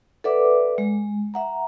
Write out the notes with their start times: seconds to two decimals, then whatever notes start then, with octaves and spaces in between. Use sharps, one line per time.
0.24 A4 B4 D5 E5 F#5 D6
0.78 G#3
1.34 E5 F#5 A#5